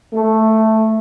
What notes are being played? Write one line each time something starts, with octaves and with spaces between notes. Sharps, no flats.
A3